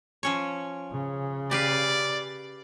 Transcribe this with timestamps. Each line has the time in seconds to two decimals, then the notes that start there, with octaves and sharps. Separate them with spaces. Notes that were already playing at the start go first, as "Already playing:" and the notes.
0.23 F3 C#4 C#5
0.92 C#3
1.51 G4 B4 D5 F5